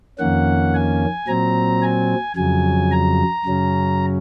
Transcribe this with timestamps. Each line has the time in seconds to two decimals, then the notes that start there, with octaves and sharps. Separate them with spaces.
0.19 F2 D#3 A#3 C#4 F#5
0.74 G#5
1.28 A#2 F#3 C4 A#5
1.82 G#5
2.36 F2 C#3 F#3 G#5
2.91 A#5
3.45 F#2 C#3 F#3 C#4